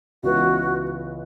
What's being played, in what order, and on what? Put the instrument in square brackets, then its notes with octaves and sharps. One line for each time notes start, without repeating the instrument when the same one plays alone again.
[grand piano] C#2 C#3 E3 B3 [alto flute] F#4